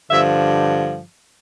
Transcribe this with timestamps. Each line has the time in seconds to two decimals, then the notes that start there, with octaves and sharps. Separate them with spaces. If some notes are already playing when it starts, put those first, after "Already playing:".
0.11 G2 D3 F3 E5